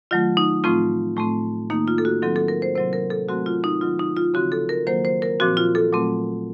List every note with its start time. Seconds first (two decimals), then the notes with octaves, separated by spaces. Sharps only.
0.11 D#3 F#3 A3 F4
0.37 D#4
0.64 A2 F3 A3 C4 F4
1.17 A2 A3 C4
1.70 D#3 A#3 D#4
1.88 F4
1.98 A4
2.05 F#4
2.22 D#3 F#3 C4 A4
2.36 A4
2.48 A#4
2.62 C5
2.75 C3 F#3 C4 C5
2.93 A#4
3.10 A4
3.29 C3 F#3 A3 C4 F#4
3.46 F4
3.64 D#4
3.81 D#3 F#3 C4 F4
3.99 D#4
4.17 F4
4.34 C#3 F3 C4 F#4
4.52 A4
4.69 A#4
4.87 D#3 F#3 A#3 C5
5.05 C5
5.22 A#4
5.40 A#2 F3 C4 F#4
5.57 F4
5.75 A4
5.93 A#2 F#3 A3 C4